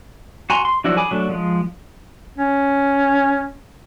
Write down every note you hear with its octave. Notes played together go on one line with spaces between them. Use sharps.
F#4 G#5 A#5 C6
C6
F3 F#3 D4 E4 F#4
G#4 G#5 B5 D6
F#3 A3 D4
F3 G#3
C#4